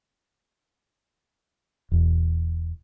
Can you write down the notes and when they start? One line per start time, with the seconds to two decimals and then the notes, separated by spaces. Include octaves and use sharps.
1.92 E1